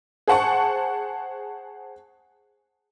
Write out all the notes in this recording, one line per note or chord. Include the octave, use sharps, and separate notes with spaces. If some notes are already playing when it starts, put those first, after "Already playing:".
G#4 C5 F#5 A5 C#6